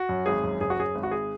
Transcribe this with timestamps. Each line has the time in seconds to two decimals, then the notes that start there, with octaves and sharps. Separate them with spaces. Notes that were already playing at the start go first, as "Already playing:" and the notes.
Already playing: F#4
0.09 F#2
0.26 G#1 G#4
0.43 F#2
0.60 F#1 G#4
0.70 F#4
0.78 F#2 G#4
0.95 G#1
1.03 F#4
1.11 G#4